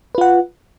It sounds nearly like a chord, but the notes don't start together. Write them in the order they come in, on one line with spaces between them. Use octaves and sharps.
B4 F4 F#5